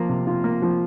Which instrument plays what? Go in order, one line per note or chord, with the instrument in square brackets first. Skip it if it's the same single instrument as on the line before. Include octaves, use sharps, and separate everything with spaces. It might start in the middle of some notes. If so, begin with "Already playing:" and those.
Already playing: [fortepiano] F3 A#3 F4
C3
F4
A#3
F3